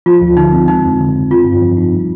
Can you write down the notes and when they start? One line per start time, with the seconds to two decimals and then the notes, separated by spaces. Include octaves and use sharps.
0.06 F3 F4
0.21 D2
0.37 D3 D#4
0.52 C4
0.68 G#3 D#4
0.84 F2
1.00 D3
1.14 F2
1.31 C4 F4
1.46 G2
1.62 F3
1.77 D#4
1.93 G3